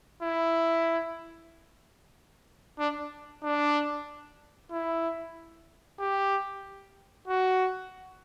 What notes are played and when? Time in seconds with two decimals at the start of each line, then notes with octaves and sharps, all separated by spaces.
0.22 E4
2.79 D4
3.44 D4
4.71 E4
6.00 G4
7.28 F#4